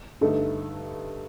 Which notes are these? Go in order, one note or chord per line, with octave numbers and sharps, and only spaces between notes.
G2 D3 A3 D#4 A4